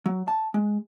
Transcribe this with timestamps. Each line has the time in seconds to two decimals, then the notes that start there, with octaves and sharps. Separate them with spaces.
0.06 F#3
0.28 A5
0.54 G#3